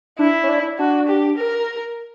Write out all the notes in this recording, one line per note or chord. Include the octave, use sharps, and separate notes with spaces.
D4 E4
C#4
D4
D4 F#4
G4
A#4